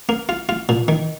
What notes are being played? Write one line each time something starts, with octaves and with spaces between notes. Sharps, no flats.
A#3
F4
F4
A#2
D#3